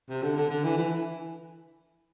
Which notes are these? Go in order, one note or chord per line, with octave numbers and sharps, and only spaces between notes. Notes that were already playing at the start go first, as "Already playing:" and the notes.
C3
D3
D3
D3
E3
E3